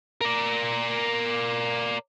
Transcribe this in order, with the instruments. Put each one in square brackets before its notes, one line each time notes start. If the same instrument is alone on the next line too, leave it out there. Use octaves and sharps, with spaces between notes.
[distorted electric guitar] A#4 D5